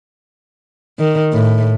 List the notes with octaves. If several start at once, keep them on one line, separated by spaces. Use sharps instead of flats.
D#3
A2